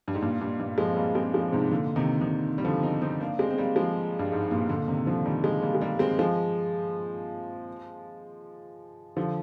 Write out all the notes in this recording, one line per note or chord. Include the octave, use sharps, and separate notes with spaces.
G2
G#2
G2 A#2
G2 A#2
G2 A#2
F3 G#3
C4
G3 A#3
G#3 C4
F3 G#3
G#2 C3
A#2 D3
C3 D#3
C3 D#3
G3
D3 F3
C4 D#4
C4 D#4
A#3 D4
G#3 C4
C4
G3 A#3
F3 G#3
G2
G#2
G2 A#2
A#2 D3
C3 D#3
D3 F3
D#3 G3
F3 G#3
G3 A#3
G#3
G3 A#3
G#3 C4
F3 G#3
D3 F3